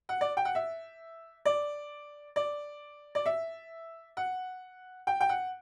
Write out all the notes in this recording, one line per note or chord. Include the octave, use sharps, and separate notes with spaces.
F#5
D5
G5
F#5
E5
D5
D5
D5
E5
F#5
G5
G5
F#5